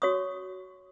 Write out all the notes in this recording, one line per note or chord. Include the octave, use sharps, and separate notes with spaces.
F#4 C#5 C#6 D#6